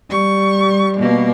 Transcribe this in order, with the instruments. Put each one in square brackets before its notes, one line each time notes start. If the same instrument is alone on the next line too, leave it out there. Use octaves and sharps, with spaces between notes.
[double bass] G3 [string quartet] C#6
[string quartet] B2 A#3